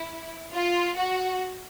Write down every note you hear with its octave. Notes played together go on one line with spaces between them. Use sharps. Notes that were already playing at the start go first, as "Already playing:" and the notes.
Already playing: E4
F4
F#4